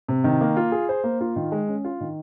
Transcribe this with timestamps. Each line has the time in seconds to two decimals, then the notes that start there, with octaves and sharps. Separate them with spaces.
0.08 C3
0.24 D#3
0.41 A#3
0.57 F4
0.72 G#4
0.89 C5
1.04 A#3
1.21 F4
1.36 D#3
1.52 G#3
1.68 C#4
1.84 F4
2.01 D#3